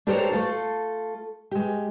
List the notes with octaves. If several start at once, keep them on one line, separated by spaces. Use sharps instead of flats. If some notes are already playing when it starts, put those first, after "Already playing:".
D4 G4 A4 A#4 C5 C#5
A3 F4 A4
G#3 G4